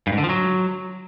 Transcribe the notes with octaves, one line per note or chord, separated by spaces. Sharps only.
G2
G#2
D3
F3
F#3